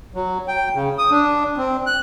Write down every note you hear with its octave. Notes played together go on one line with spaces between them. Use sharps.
F#3
G5
C#3
D#6
D4
C4
F#6